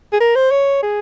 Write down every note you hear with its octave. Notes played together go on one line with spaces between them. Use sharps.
G#4
A#4
C5
C#5
G#4